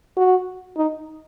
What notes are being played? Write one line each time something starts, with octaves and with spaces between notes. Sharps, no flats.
F#4
D#4